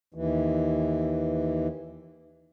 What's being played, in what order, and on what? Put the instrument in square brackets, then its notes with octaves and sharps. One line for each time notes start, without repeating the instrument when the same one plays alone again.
[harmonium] D#2 E3